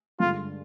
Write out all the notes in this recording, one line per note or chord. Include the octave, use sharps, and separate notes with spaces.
G2 D3 G#3 F4